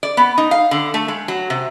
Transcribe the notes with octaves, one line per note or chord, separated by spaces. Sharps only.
D5
B3
D#4
F5
D3
A3
G#3
F#3
C3